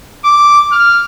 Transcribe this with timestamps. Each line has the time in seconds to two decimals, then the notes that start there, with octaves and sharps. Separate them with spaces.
0.25 D6
0.72 F6